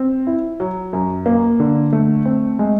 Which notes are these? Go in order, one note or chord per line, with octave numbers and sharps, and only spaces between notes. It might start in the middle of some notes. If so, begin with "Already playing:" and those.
Already playing: C4
E4
F#3
F#2
A#3
D3
A3
C4
G#3